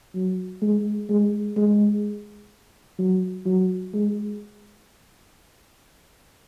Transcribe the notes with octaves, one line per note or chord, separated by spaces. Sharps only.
F#3
G#3
G#3
G#3
F#3
F#3
G#3